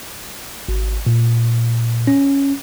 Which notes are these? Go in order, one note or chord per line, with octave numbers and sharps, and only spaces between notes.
G#1
A#2
C#4